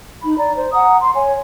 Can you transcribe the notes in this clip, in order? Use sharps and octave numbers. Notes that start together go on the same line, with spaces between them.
D#4 B5
D5 A#5
C5
F#5 A#5 D#6
C6
C#5 G#5